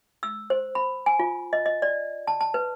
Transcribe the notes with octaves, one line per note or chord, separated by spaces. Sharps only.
E6
C5
B5
G#5
F4
D#5
D#5
D5
A5
A5
B4